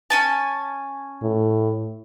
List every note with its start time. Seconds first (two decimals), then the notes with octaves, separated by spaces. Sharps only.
0.10 C#4 G#5 A5
1.22 A2